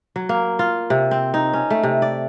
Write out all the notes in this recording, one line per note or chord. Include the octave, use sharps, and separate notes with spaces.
F#3
A#3
F4
C3
C4
D#4
C#4
A3
C3
D5